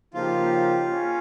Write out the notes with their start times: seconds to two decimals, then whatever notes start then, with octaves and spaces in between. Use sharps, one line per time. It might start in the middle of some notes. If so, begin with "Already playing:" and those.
0.14 C#3 F3 A#3 D#4 F4 G4
0.90 C#4